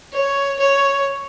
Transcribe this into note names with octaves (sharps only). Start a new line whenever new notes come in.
C#5
C#5